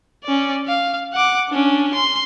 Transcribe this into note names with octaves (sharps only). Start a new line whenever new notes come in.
C#4 D5
F5
F#5 D6
C#4 D4
C6